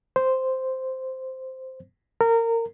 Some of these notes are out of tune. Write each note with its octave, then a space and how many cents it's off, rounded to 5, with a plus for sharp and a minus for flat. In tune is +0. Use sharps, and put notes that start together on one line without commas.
C5 -5
A#4 -25